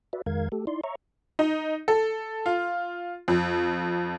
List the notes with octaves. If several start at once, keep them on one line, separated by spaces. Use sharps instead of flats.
F#4 B4 D5 E5
F2 D#3 G#3 A#4 F5 G#6
A3 G4 A4
D#4 E4 D5 C6
C#5 E5 A#5 C#6
D#4
A4
F4
F2